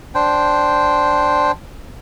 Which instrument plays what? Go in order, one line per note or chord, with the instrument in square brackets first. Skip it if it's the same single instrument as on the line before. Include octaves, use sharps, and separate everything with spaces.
[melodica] D4 C5 G5